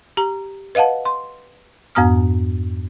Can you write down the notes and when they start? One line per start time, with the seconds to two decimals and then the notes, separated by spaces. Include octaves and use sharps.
0.17 G4 A#5
0.75 B4 D#5 F5 F#5 A5
1.05 C6
1.95 F2 G#2 B3 A#5 D#6 F6